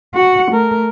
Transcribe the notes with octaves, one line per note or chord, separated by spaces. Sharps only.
F#4 F#5
A3 A#4